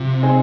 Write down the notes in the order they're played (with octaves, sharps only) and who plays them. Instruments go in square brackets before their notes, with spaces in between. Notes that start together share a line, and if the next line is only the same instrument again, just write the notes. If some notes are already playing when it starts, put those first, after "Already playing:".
Already playing: [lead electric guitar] C3 [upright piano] F3
[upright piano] C4 D#4 G#4